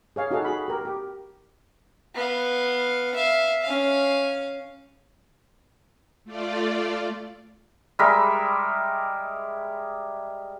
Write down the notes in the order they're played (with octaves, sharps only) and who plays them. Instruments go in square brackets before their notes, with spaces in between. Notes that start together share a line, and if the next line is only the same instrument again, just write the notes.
[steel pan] G#4 C#5 F5
D#4 F#4 G#4 A4 F5
F#4 G#4 B5
G4 A#4
G4
[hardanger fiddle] B3 F5
E5 F5
C#4 F5
[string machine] A3 F4 D5
[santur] G3 G#3 A#4 E5